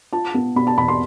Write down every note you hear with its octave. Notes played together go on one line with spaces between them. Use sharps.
F4 A5
B3
B2 B5
A5
E2 B5
C6